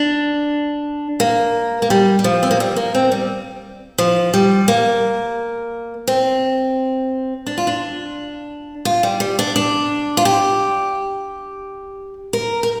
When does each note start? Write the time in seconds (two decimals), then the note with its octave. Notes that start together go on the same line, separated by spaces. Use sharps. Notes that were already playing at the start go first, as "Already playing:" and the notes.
Already playing: D4
1.20 A#3
1.82 A#3
1.90 G3
2.19 G3
2.24 F3
2.43 C4
2.51 A#3
2.60 G3
2.76 A#3
2.95 C4
3.12 G3
3.98 F3
4.34 G3
4.68 A#3
6.07 C4
7.46 D4
7.58 F4
7.67 D4
8.85 F4
9.03 G3
9.20 G3
9.39 D4
9.56 D4
10.17 F4
10.25 G4
12.33 A#4
12.63 A#4